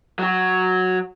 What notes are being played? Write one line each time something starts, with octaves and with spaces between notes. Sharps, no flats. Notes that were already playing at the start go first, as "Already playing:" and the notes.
F#3 F#4